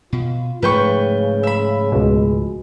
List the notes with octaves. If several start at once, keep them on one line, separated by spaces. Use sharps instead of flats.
B2 F4
G#2 C#3 F3 A3 B4 G5 C#6
E5 B5
C#2 B2 G#3